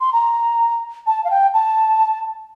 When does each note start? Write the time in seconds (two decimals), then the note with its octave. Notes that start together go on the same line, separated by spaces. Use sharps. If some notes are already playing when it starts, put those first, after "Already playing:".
0.01 C6
0.13 A#5
1.07 A5
1.24 F5
1.30 G5
1.54 A5